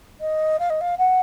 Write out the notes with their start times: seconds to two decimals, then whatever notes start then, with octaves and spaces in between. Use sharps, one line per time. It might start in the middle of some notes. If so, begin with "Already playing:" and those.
0.21 D#5
0.60 F5
0.70 D#5
0.81 F5
0.98 F#5